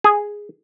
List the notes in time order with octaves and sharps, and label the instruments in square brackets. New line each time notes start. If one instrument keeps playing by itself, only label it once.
[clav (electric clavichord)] G#4